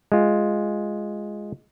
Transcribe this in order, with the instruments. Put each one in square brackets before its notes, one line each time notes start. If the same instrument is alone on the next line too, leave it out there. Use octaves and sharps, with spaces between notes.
[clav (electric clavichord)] G#3 F4